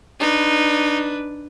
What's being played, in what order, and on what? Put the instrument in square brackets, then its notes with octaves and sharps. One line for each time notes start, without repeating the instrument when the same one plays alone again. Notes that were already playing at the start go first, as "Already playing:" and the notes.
[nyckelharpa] D4 B4 [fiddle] D#4